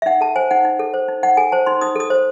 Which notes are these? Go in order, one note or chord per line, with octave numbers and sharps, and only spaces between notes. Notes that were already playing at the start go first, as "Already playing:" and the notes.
E5
D#4 F#5
A4 A5
C5 G#5
D#4 F#5
D#4
A4
C5
D#4
D#4 F#5
A4 G#5
C5 A5
D#4 C6
D#4 D#6
A4 D#6
C5